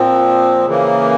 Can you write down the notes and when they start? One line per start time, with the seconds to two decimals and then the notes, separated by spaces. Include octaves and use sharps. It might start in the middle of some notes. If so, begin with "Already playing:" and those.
Already playing: A#2 F3 C4
0.66 C#3 E3 A#3